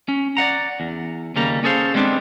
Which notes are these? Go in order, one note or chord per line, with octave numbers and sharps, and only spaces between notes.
C#4
D5 D#5 F#5 A#5
E2
D#2 C#3 G3 A#3 A#5
C#4 G#4 A4 C5 F5
G3 G#3 B3 C4 D4